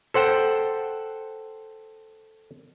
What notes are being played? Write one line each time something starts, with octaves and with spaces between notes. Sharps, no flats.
A4 C5 F#5 G5